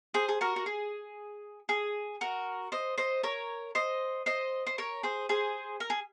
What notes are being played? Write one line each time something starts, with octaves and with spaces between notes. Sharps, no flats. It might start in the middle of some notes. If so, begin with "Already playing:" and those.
G#4 C5
G#4
F#4 A#4
F#4
G#4
G#4
F#4 A#4
C5 D#5
C5 D#5
A#4 C#5
C5 D#5
C5 D#5
C5
A#4 C#5
G#4 C5
G#4 C5
A#4
G#4